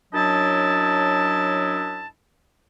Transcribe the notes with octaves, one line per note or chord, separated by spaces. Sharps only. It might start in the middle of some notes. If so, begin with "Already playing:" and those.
F#2 F#3 D4 E4 D#5 A5